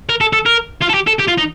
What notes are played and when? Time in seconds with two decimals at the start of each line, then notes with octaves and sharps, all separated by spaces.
0.09 A#4
0.21 A4
0.33 A4
0.46 A#4
0.82 F4
0.90 A4
0.94 G4
1.07 A4
1.19 G4
1.28 F4
1.37 D#4